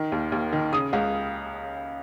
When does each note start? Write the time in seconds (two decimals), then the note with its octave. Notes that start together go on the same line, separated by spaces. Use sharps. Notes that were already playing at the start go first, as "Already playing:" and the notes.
Already playing: D#3
0.12 D#2
0.32 D#2
0.53 D#3
0.73 C#3 D#6
0.93 C#2